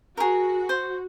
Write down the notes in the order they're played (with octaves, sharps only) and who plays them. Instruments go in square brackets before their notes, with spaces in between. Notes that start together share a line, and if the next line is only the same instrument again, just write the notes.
[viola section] F#4 [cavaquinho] G#4 A#4
[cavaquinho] C5